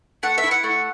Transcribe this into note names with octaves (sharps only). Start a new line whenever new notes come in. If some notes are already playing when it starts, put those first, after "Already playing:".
A3 F#5
E5
E4
F#5
A3